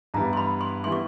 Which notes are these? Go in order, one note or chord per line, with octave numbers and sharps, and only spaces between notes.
G2 E3 G3 B3 E4 A#5
C6
B5
C6
E3 G3 B3 E4 C6
C#6